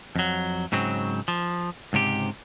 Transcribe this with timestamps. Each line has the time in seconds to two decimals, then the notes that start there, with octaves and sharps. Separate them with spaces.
0.16 F2 F#3
0.72 G#2 C#3 F#3 C4
1.28 F3
1.93 C#2 G#2 C3 G4